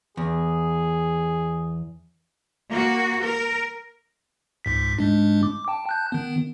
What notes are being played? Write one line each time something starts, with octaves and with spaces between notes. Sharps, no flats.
E2 G#4
A#3 F#4
A#4
C#2 G#2 B6
G#2 G#3 D4
D6
G5 A5
A5 F#6 G6
D#3 B3